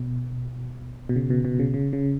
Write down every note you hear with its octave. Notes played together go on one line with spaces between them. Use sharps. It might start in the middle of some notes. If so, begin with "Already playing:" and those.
Already playing: B2
B2
C#3
B2
B2
C#3
C#3
C#3